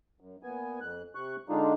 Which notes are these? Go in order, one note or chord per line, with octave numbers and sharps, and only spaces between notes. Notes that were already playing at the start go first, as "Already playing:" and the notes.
F#2
A#2 B3 G#5
F2 F#6
C3 C#6 F#6
D3 G#3 D4 D#4 F4